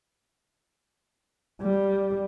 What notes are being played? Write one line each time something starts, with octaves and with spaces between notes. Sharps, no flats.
G3